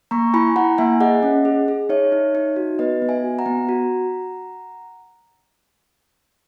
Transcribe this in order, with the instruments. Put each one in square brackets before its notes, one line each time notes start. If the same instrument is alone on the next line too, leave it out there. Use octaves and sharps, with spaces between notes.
[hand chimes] A#3 A#5 C#6
E4 G#5 B5
E4 F#5 A#5
A#3 E5 G#5
G#4 D#5 F#5
C#4
G#4
G#4
D#4 C#5 E5
D#4
D#4
F#4
B3 B4 D#5
B3
E5 G#5
F#4
F#5 A#5
B3
F#4